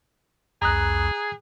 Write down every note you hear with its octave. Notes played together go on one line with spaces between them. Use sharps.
C2 F2 G#4 A#5 D#6 F#6